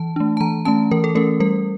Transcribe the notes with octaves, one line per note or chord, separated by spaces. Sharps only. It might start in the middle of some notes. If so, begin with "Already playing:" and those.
Already playing: E3 A5
A3 D4
A5
E3 A#5
A3 C#4 A5
E3 A#4
A4
A3 C#4 A#4
G3 A#4